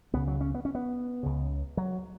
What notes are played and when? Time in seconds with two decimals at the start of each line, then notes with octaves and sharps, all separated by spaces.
0.13 C#2 C#3 B3
0.28 F#3
0.41 C#4
0.55 B3
0.65 C#4
0.75 B3
1.23 C#2 C#3
1.77 F#3